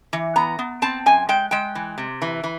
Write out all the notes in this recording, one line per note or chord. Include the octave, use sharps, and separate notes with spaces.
E3
B3 A#5
B3
C4 A5
F#2 G#5
G#3 G5
G#3 G5
E3
C3
E3
E3